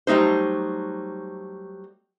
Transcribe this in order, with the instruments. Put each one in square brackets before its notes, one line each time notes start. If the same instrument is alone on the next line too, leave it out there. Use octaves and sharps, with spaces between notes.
[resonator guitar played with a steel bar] F#3 G3 A3 D#4 C5